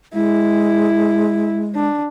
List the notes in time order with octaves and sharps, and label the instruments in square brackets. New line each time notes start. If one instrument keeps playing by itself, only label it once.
[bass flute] G#3 [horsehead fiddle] E4
[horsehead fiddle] D4